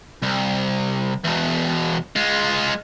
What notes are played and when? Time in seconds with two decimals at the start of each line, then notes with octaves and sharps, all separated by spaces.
0.22 C2
1.24 E2 B2
2.16 G#3 F4